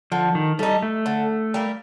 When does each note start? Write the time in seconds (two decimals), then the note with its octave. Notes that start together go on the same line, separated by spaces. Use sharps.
0.12 D3 F3
0.35 D#3
0.59 G3 A3 D#4
0.82 A3
1.06 D3
1.54 G3 A#3